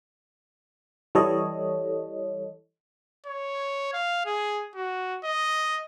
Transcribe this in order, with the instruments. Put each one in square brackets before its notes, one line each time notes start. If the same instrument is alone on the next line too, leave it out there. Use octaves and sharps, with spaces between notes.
[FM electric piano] E3 G3 A4 C#5 D#5
[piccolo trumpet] C#5
F5
G#4
F#4
D#5